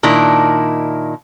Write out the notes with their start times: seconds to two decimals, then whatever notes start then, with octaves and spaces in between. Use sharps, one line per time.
0.03 A#2 D#3 D4 E4